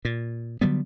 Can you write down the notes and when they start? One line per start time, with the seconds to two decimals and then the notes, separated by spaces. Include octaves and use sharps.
0.05 A#2
0.61 D3 F#3 G3 B3